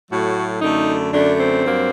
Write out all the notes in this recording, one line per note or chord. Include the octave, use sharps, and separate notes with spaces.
A2 F#3 A3 F#4
F#2 D3 A3 D#4
F#2 D3 A3 D4
C4
G2 F#3 A#3